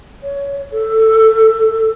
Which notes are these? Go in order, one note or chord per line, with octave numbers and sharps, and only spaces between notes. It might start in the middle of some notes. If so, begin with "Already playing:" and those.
C#5
A4